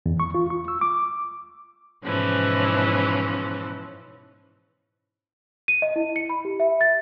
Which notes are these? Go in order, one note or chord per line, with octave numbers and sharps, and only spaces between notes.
E2
C#6
F4
C#6
E6
D6
G#2 B2 E3 F3 C#4
D#7
D#5
E4
C#7
B5
G4
E5
A6